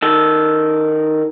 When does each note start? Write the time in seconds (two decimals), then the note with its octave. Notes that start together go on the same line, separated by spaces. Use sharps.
0.02 D#3 A4